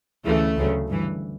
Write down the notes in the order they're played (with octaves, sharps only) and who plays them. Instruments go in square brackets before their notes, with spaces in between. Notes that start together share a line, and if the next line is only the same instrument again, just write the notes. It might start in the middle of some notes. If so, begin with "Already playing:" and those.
[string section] D2 C#3 E3 A3
D2 C#3 F#3
G2 E3